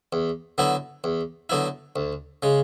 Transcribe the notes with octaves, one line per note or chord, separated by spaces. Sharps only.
E2
D3 F#3 B3 E4
E2
D3 F#3 B3 E4
D2
C#3 G#3